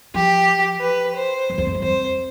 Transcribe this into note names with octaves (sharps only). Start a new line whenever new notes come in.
F3 G4
B4
C5
F2
E2
F2
G2
F2 C5